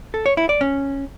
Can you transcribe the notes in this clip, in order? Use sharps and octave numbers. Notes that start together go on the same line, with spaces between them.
A4
C#5
E4
D5
C#4